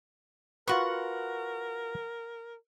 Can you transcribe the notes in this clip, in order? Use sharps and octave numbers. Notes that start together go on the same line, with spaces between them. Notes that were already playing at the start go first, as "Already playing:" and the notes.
F4 F#4 A#4 B4 F#5 C#6